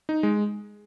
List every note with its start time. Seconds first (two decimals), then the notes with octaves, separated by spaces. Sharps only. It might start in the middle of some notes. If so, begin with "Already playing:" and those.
0.09 D#4
0.23 G#3